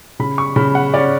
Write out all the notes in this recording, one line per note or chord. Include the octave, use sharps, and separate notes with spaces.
C#3 B5
C#6
C#3 B5
F#5
C#4 D5